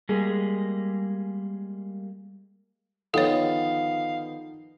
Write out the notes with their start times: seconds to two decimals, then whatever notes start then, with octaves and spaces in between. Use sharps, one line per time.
0.09 G3 G#3 A#3 G#4
3.14 D3 D#3 F3 B3 D#4 A4 C#5 F5